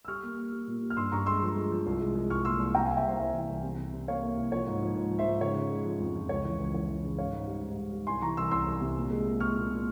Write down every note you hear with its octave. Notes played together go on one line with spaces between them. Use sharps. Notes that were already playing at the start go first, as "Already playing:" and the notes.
E6
G3 C#6 F6
A#3
A#3
G3
A#2
G3
F6
G2 C6 E6
G2 A#5 C#6
G#3 C6 E6
F3
G#3
F3
C2
G#3
G#3
C2 C#6 F6
A#2 C6 E6
C2
C3 G5 A#5
C2 F5 G#5
E5 G5
C2 C5
C2 C5 E5
E3
C2
C3
C3
C3
A#3 C#5 F5
A#3
C2
F3 C#5
G#2
F3
G#2
F3
C5 E5
G#2
C#3 C#5
C#3
G#3
F3
F2
F3
C#2 C#5
E3
C#2
E3 C#5
E3
C#3
G#2 C#5 F5
G#2
G3
G#2
G#2
G3
C2 G#5 C6
E3 A#5 C#6
C2 C6 E6
C2 C6 E6
C2
C3
A#2
G#3
A#2
G#3 C#6 F6
A#2
A#2